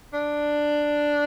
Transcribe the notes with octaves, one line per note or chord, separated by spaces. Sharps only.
D4